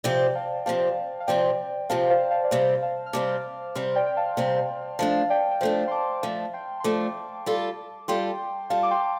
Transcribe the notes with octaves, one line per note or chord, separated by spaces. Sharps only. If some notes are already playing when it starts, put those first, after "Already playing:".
C3 F3 C4 G4 D5 G5
F5 A5
C3 F3 C4 G4 F5 A5
F5
C3 F3 C4 G4 D5 G5
C3 F3 C4 G4 F5 A5
C5 F5
F5 A5
D5
C3 G3 C4 C5 F5
F5 A5
F6
C3 G3 C4 A5 D6
C3 G3 C4 C6 F6
D5 G5
G5
F5 A5
C3 G3 C4
F3 A3 D4 F5 A5
D5 G5
G5
F3 A3 D4 C5 F5
C6
A5 D6
F3 A3 D4 F5 A5
G5 C6
C6
F3 A3 D4 A5 D6
G3 F4 A4
G3 F4 A4 G5 C6
G3 F4 A4 F5 A5
D6
G5 C6